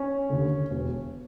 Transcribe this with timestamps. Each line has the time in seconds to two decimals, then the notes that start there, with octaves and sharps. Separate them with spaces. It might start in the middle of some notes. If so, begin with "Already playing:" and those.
Already playing: C#4
0.30 D#2 D3
0.71 E1